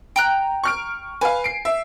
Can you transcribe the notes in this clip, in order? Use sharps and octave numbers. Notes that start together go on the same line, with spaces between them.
G5 A#5 F#6
C#6 F6 D7
B4 F5 G#5
C7 D7
E5